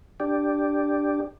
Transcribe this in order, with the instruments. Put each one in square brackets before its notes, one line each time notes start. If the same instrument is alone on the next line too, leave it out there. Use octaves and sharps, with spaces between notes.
[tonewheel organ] D4 G4